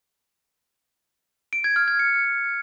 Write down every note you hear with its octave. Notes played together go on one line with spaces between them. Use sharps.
D7
G#6
F6
G#6
C#7